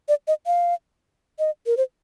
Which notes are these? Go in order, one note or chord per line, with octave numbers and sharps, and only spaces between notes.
D5
D#5
F5
D#5
A#4
C5